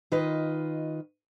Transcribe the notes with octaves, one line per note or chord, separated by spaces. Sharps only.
D#3 F4 B4 D#5